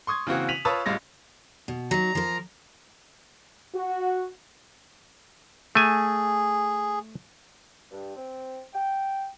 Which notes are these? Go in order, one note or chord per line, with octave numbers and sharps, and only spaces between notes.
C6 C#6 D#6 G#6
C#3 E3 A#3 C4 F#4
B6 D#7 F7 F#7
F4 B4 C#5 A5 D#6 E6
A1 G3 G#3 F4 A#6
B2
F#3 D#4 A#5
F3 A#4
F#4
A3 G#4 G#5
G2
C4
G5